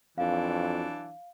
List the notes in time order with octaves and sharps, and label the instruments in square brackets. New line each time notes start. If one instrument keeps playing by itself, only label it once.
[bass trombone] F2 [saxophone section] E3 F#3 D4 [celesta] F5